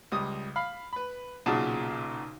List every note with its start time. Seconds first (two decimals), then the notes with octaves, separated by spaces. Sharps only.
0.12 C#2 G3 D#6
0.56 F5 B5
0.93 B4 B5
1.46 B1 A#2 C#3 F#4 G#4 A5